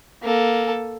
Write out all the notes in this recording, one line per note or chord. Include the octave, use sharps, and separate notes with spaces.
A#3 A4